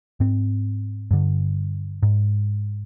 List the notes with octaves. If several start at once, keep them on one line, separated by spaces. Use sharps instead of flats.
G#2 C4
G2 D3
G#2